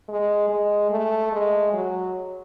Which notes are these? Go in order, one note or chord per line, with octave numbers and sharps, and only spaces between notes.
G#3
G#3
A3
G#3
F#3